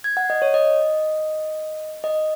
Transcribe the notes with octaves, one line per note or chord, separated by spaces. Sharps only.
G#6
F#5
D#5
C#5
D#5
D#5